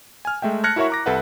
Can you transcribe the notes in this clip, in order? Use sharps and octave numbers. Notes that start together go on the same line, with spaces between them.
G#5 F6
G#3 A3 E5 G5
A5 F6 F#6 G#6 A#6 C#7
E4 F#4 A#4 C#5 E5 C#6
A#5 D6 A#6
C2 A4 B4 E5 F#5